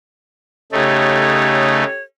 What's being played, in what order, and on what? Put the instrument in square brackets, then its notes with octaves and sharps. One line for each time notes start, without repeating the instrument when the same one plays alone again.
[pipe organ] C#3 A3 D#4 [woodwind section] G4 A4 C#5